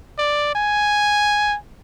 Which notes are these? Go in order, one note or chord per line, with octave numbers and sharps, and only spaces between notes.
D5
G#5